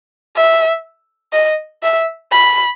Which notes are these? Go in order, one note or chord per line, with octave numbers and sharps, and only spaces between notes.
E5
D#5
E5
B5